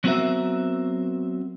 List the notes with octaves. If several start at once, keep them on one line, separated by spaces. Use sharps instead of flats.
F#3 B3 C4 F#4 A#4 E5